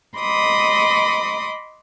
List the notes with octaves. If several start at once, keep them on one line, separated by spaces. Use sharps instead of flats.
D#5 B5 C6 D6 D#6